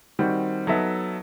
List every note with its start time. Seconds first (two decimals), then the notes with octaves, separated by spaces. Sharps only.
0.19 D#3 G3 C4 F#4
0.67 F#3 B3 D#4 A4 E5